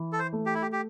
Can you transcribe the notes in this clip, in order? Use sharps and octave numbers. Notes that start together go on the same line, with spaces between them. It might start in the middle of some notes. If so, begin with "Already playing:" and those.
Already playing: E3
A4
C5
A3
G4
E4
G4
G4